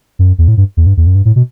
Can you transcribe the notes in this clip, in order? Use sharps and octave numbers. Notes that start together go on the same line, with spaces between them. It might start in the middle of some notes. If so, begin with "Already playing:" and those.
F#2
E2
A2
G2
E2
G2
E2
F#2
G2
A2
B2